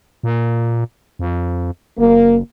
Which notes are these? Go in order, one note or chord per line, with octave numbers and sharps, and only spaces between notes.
A#2
F2
F#1 A#3